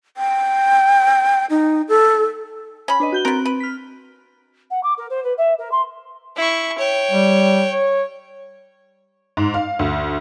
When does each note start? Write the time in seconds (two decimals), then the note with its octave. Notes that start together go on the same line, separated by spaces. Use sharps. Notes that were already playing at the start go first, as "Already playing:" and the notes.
0.17 G5
1.50 D#4
1.89 A4
2.88 C#4 B5
3.00 D4 B4 D#5
3.12 F#4 G6 G7
3.25 B3 C4 A#4 F#6 D7
3.46 B4
3.60 F6 B6
4.71 F#5
4.83 D6
4.98 A#4
5.10 C5
5.24 B4
5.38 E5
5.58 A#4
5.71 C6
6.36 E4 C#6
6.78 C#5 G5
7.11 G3
7.71 C#5
9.37 G#2
9.54 F5
9.79 D2